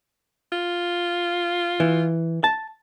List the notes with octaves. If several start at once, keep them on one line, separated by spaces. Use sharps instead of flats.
F4
E3
A5